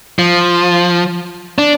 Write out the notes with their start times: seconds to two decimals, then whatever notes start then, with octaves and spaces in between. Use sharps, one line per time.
0.19 F3
1.58 D4